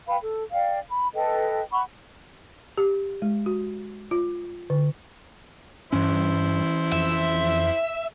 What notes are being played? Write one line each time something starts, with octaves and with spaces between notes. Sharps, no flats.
B4 F5 G5 B5
A4
D5 F5 G5
B5
A4 B4 D#5 G5
F#5 B5 C#6
G4
G#3
F#4
F4
D3
G2 E3 C#4 E4 C5
F2 E5